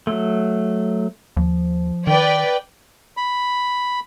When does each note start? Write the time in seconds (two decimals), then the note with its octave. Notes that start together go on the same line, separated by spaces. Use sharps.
0.07 F#3 A3
1.37 D#2 F3
2.07 D#3 B4 D5 G5
3.17 B5